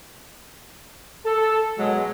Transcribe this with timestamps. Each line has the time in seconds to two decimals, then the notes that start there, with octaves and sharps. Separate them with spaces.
1.25 A4
1.79 B2 F#3 G#3